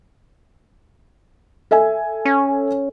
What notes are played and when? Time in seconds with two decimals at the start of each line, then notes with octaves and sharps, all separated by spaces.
1.71 A4 E5 G#5
2.25 C#4